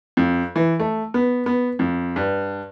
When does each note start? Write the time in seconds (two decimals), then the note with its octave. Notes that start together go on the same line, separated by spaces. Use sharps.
0.17 F2
0.56 E3
0.80 A3
1.14 B3
1.46 B3
1.79 F2
2.16 G2